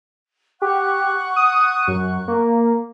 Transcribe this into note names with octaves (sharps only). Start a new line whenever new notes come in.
G4 F#5 C#6 F#6
D#6
F#2
A#3